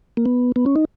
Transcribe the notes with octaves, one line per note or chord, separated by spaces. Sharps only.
A#3
B3
B3
C#4
D#4